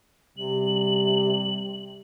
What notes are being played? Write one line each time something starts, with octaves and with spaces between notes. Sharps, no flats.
C3 G3 F#7